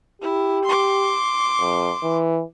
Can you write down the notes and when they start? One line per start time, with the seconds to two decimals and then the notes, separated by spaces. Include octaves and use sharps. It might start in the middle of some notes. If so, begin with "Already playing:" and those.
0.22 E4 G4
0.65 C6 D6
1.61 F2
2.03 E3